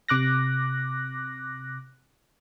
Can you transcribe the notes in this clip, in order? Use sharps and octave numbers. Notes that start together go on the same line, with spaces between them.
C3 D6 F#6 A#6